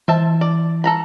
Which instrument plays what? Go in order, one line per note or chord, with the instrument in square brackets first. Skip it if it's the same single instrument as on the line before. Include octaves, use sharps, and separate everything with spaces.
[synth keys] E3 [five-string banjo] C5 E5 A5
[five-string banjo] D5
A4 A#5 B5